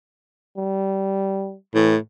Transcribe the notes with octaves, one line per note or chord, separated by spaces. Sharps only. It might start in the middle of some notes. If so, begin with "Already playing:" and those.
G3
A2 E3